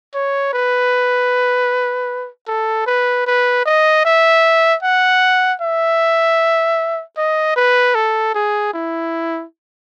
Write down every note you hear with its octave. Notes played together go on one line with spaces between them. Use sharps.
C#5
B4
A4
B4
B4
D#5
E5
F#5
E5
D#5
B4
A4
G#4
E4